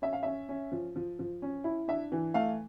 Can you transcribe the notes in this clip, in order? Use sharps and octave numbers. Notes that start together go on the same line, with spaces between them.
C#4 E5
F5
C#4 E5
C#4
F3
F3
F3
C#4
E4
D4 E5
E3
A3 F5